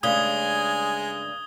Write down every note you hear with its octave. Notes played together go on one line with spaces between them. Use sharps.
G2 C#3 G#3 A3 G#5 D#6 G#6 G7